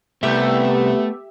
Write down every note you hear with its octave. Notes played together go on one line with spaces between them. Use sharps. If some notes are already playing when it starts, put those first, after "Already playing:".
C2 A3 B3 G4 E5